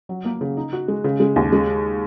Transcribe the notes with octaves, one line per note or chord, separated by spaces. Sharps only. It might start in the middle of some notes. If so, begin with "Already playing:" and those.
F#3
A#3
C#3
D#4
F#4
G#3
C#3
G#3
D#2
G#3